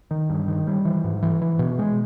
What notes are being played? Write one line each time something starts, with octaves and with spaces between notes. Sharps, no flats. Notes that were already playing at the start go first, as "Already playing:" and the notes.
D#3
G2
D#3
G3
E3
G#2
E3
E3
B2
G#3